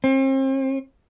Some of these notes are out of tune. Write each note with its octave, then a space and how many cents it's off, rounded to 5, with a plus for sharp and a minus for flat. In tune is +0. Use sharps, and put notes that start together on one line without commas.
C4 +40